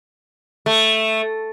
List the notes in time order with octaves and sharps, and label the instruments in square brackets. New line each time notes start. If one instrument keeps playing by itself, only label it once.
[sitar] A3